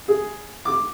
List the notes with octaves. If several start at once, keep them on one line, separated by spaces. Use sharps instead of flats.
G#4
D6